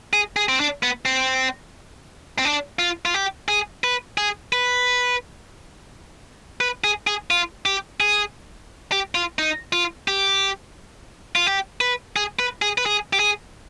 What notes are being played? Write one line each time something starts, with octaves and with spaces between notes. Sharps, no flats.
G#4
G#4
C4
D4
B3
C4
C4
D4
F4
F4
G4
G#4
B4
G#4
B4
B4
G#4
G#4
F4
G4
G#4
G4
F4
D#4
F4
G4
F4
G4
B4
G#4
B4
G#4
B4
G#4
G4
G#4